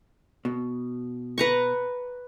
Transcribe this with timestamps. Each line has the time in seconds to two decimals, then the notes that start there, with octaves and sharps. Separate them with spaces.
0.45 B2
1.38 B4 A#5 C#6